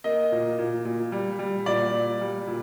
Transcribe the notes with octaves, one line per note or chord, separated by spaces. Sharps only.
A#3 D#5
A#2
A#2
A#2
G3
G3
A#2 D5
A#2
G3
A#2